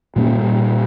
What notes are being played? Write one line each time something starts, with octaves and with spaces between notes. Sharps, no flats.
A#2 G3 A#3 C#4